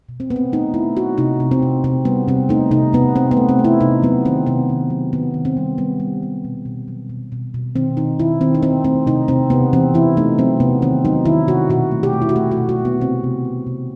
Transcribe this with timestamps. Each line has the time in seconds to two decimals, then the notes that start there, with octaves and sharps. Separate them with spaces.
0.09 B2
0.20 C4
0.30 A3 B3
0.36 C4
0.52 A3 D#4
0.74 A3 E4
0.96 A3 F#4
1.18 C3 D#4
1.40 C3
1.51 C4
1.62 C3
1.84 C3 C4
2.05 G3 B3
2.28 C3 C4
2.49 A3 D#4
2.71 C3 D#4
2.93 C3 B3
3.15 C3 C4
3.31 B3
3.37 A3
3.49 C4
3.59 A3
3.65 E4
3.81 C3 D#4
4.02 F#3 B3
4.25 D#3 C4
4.46 C3 B3
4.69 D#3
4.90 F#3
5.13 D#3 B3
5.34 D#3
5.45 C4
5.57 G3
5.78 G3 B3
6.00 G3
6.23 G3
6.45 B2
6.65 B2
6.88 F#3
7.09 B2
7.32 B2
7.54 B2
7.76 D#3 C4
7.97 D#3 D#4
8.20 D#3 E4
8.41 D#3 C4
8.55 D#4
8.63 D#3 C4
8.84 A3 C4
9.06 C3 D#4
9.28 C3 C4
9.50 C3 B3
9.73 E3 C4
9.94 E3 E4
10.17 A3 D#4
10.38 F#3 C4
10.60 C3 B3
10.82 D#3 C4
11.05 F#3 D#4
11.25 D#3 E4
11.47 C3 F#4
11.70 B2 F#4
11.91 A3
12.03 G4
12.13 A3
12.22 E4
12.29 F#4
12.36 A3 G4
12.51 F#4
12.57 B2
12.69 F#4
12.79 B2
12.85 B3
13.01 C3 C4
13.24 C3
13.45 C3
13.67 C3